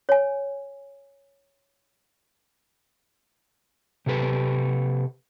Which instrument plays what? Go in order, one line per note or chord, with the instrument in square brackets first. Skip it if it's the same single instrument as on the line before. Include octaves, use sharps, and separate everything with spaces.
[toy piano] C#5 G#5
[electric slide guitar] C3 G4 A4 B4